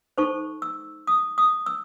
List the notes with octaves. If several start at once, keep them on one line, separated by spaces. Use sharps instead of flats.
D#4 A4 C5 C#6
E6
D#6
D#6
E6